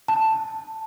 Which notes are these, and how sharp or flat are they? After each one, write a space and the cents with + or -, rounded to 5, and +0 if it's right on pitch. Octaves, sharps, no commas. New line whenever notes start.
A5 +5